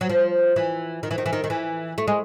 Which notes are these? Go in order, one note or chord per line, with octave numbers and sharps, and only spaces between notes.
F#3
F3
E3
D#3
E3
D#3
E3
D#3
D#3
E3
A3
G#3